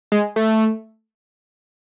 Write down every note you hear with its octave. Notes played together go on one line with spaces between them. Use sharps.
G#3
A3